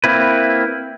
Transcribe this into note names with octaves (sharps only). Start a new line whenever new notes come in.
A#3 C4 E4 B4